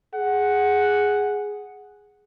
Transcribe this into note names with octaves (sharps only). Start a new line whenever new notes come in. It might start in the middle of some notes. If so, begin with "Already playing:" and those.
G#4 F#5